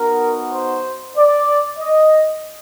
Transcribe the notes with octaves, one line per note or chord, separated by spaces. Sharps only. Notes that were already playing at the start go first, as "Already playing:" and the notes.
Already playing: B3 D#4 F#4 A#4
C5
D5
D#5